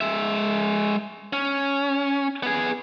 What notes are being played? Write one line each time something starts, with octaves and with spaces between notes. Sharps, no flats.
G#3 E5
C#4
B3 G#4